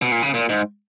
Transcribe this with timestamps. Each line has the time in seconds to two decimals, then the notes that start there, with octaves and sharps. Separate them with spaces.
0.02 B2
0.12 A#2
0.22 C#3
0.34 A#2
0.49 G#2